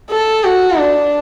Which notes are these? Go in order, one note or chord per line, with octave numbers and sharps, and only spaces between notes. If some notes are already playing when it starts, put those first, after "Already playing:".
A4
F#4
D4